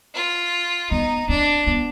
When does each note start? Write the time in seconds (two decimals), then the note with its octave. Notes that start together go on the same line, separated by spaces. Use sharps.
0.15 F4
0.91 B3 D#4
1.29 C4 D4
1.67 B3